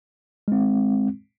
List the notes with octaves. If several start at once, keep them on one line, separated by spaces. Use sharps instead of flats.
G#3 C4